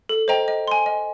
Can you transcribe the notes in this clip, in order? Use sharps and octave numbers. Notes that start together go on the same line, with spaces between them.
A4
C5 D#5 G5 A#5
D#5
G#5 C6
D#5